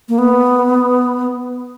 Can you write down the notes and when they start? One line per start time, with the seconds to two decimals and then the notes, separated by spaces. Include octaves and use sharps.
0.09 A#3
0.18 B3